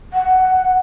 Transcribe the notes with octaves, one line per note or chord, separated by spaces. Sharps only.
F#5